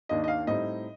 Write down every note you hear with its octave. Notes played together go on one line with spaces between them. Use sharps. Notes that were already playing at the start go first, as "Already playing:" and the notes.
D#2 D#3 A#3 D4 D#5
D#5
F5
A2 G3 C4 D#4 D#5